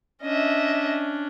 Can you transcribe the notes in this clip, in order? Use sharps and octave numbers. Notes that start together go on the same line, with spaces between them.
C#4 D4 D#5 E5